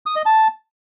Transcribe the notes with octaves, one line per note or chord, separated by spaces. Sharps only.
D#6
D#5
A5